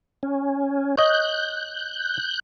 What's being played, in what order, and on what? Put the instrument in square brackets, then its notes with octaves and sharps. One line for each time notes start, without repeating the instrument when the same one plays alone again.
[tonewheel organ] C#4
[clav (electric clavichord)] C#5 D#5 [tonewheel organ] F#6 G6